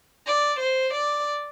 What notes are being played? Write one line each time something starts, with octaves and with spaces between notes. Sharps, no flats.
D5
C5
D5